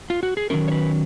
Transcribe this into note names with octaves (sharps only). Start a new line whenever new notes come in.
F4
F#4
G#4
D#3 F#3 C#4 A#4
C#5
B4